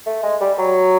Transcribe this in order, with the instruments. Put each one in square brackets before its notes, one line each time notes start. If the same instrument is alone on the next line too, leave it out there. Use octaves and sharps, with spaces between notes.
[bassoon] A3
G#3
G3
F#3